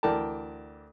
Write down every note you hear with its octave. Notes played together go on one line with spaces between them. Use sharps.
D2 E3 A#4 D5 G5 A5